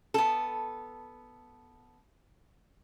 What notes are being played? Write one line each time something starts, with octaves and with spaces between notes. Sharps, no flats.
B3 A4